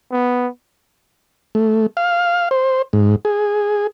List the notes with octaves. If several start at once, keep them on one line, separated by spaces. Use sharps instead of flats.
B3
A3
F5
C5
G#2
G#4